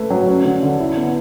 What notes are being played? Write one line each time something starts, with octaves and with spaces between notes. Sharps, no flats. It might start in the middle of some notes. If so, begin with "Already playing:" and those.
Already playing: A3 B4
F#3
C#4
D3
D3
E4
B3